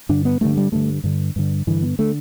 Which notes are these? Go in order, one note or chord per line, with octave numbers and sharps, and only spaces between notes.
G2 D3 D4
B3
G2 D3 A3
G3
G2 D3 A3
G2 D3
G2 D3
G2 D3 E3
B3
D3 A3